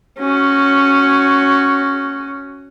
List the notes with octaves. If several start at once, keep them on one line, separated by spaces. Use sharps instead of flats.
C#4 F#4